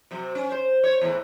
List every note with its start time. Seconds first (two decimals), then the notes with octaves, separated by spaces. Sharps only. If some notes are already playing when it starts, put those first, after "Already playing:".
0.11 C3 F#3
0.35 C#4
0.52 C5
0.84 C#5
1.01 E2 A2 E3